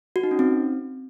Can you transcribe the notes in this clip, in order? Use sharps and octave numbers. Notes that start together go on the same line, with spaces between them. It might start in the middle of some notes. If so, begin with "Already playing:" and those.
F#4
D#4
C#4
C4